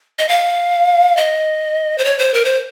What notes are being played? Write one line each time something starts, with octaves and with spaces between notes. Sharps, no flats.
D#5
F5
D#5
C5
C#5
C5
A#4
C5